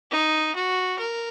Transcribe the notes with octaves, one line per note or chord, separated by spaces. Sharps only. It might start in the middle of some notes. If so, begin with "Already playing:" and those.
D#4
F#4
A#4